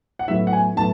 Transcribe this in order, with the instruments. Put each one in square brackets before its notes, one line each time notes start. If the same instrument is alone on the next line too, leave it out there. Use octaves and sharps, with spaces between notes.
[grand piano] F#5
[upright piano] A2 F#3 B3 E4 [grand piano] E5
[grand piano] F#5
G#5
[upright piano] A2 F#3 B3 E4 [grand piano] A5